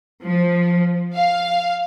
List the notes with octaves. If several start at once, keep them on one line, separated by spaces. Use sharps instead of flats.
F3
F5